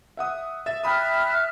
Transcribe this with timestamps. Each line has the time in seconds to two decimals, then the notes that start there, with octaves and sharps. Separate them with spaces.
0.17 E5 F#5 D#6
0.66 E5 A6 E7
0.84 E5 G5 B5 D#6 F6 F#6